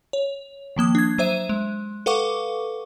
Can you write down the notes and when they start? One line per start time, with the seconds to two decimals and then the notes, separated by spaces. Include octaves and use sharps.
0.13 C#5
0.76 D#3 F3 A#3 D#6
0.95 D4 G#6
1.18 F#3 C5 E5 D#7
1.49 G#3
2.06 A4 B4 F5 F#5 C#6 D6